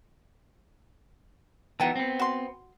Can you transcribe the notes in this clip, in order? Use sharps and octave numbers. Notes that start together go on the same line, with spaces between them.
E3 B3 D#4 F#4 G5 A5
B3 C4
F#4 C6